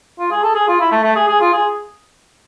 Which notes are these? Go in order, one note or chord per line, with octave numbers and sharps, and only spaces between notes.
F4
G#4
A4
G#4
F4
E4
A3
A3
G#4
G#4
F4
G#4